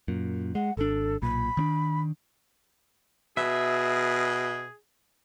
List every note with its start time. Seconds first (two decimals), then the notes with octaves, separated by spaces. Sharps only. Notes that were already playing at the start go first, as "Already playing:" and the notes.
0.08 F#2 A#2
0.55 G#3 F#5
0.77 G#1 D4 A4
1.22 B1 A#2 B5
1.57 D#3 C4 D4
3.37 B2 G#4 E5